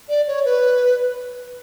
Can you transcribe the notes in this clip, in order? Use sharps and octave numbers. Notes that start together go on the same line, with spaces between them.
D5
C#5
B4